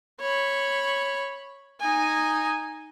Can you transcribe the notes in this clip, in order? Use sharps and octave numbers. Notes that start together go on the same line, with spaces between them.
C#5 B5
D#4 G#5